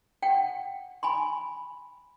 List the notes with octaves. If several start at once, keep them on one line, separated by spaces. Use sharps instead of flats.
F#5 G5
G#5 B5 C6